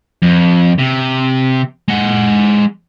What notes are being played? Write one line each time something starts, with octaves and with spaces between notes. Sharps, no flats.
F2
C3
G#3 F#5